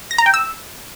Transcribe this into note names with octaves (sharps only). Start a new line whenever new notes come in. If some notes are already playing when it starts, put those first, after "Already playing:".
A#6
A#5
G5
E6